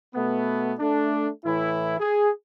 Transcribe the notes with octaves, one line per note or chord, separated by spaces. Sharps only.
B2 A3 B3
A3 D4
A2 E3 E4
G#4